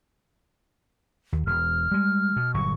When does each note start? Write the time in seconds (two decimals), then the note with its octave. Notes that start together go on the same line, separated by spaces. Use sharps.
1.32 D#2
1.47 E1 F6
1.91 G3 G#3
2.36 B2
2.54 G1 A#2 F#3 C#6